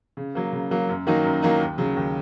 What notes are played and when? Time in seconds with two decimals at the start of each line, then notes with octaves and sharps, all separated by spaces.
0.17 C#3
0.35 F#3 A#3
0.53 C#3
0.71 F#3 A#3
0.89 F#2
1.07 D#3 F#3 A#3 D#4
1.24 F#2
1.42 D#3 F#3 A#3 D#4
1.60 D#2
1.78 C#3 F#3
1.96 D#2